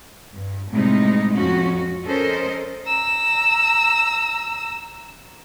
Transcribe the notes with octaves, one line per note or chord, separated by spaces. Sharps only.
G2
A2 C3 G3 G#3 D#4
F2 F3 C#4 F#4
C#4 A4 A#4 C5 D#5
A#5 E6